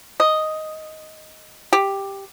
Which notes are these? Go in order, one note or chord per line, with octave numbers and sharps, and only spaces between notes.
D#5
G4